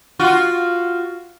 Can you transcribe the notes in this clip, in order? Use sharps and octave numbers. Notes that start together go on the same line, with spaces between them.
F4 F#4